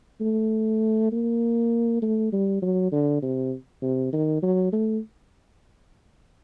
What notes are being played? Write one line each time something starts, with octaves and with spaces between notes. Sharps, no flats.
A3
A#3
A3
G3
F#3
D3
C3
C3
D#3
F#3
A3